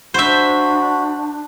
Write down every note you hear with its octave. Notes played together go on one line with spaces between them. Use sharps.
D4 F#4 C5 E5 B5